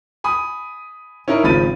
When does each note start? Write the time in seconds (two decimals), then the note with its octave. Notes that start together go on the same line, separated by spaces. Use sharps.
0.24 G#5 B5 D#6
1.28 C#4 D#4 E4 A#4
1.44 G#1 C#3 F3 B5 A6 D#7